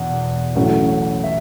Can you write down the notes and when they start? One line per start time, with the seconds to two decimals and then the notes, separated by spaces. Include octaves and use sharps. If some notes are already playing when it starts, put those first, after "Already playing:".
Already playing: E1 E2 B2 F#5
0.55 A1 A2 F#3 A3 C#4
1.24 E5